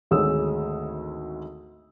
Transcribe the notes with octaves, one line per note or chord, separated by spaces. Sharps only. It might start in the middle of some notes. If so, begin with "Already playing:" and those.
G#1 D2 G#3 C#5 D#6 E6